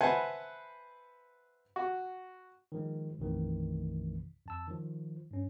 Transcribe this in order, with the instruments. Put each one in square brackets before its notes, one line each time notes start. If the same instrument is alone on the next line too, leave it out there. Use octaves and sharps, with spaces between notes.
[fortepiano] B4 C5 E5 F#5 G#5 A5
F#4
[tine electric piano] D#3 F3 G#3
B1 F#2 C3 D#3 E3 A3
F2 A5 E6
D#3 F3
G2 C#4